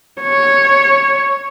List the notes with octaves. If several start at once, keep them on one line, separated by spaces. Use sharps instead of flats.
C#5